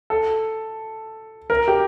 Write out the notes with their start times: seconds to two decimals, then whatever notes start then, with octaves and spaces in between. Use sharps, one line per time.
0.10 A4
1.50 A#4
1.68 G4